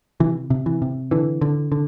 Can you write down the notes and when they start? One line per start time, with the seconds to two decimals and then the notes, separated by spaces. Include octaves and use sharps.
0.20 C3 E3
0.50 C3
0.66 E3
0.82 C3
1.11 D3 E3
1.41 D3
1.72 D3